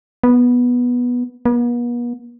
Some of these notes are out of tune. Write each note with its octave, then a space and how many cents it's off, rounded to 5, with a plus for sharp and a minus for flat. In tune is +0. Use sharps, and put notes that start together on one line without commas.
B3 -10
B3 -45